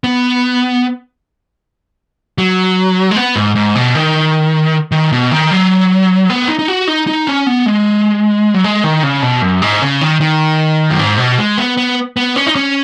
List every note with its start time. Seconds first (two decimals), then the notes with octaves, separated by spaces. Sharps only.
0.04 B3
2.38 F#3
3.11 G#3
3.16 B3
3.36 G#2
3.55 G#2
3.75 B2
3.95 D#3
4.92 D#3
5.12 B2
5.31 D#3
5.51 F#3
6.30 B3
6.48 D#4
6.59 D#4
6.68 F#4
6.87 D#4
7.07 D#4
7.27 C#4
7.46 B3
7.66 G#3
8.54 F#3
8.64 G#3
8.84 D#3
9.03 C#3
9.22 B2
9.42 F#2
9.62 G#2
9.82 C#3
10.01 D#3
10.21 D#3
10.90 F#2
10.99 G#2
11.18 B2
11.38 G#3
11.58 B3
11.77 B3
12.17 B3
12.36 C#4
12.46 D#4
12.55 C#4